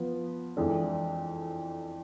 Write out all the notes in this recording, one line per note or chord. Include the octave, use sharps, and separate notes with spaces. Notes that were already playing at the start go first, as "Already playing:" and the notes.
Already playing: F3 B3
F2 E3 G#3 D4 A4